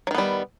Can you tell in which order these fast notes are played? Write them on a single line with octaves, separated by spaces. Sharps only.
F#3 D#3 B3 G3